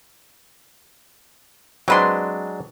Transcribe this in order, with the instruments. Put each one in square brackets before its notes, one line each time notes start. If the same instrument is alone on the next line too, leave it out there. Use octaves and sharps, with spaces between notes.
[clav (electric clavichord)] F#3 G#3 D4 [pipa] C4 B4 C6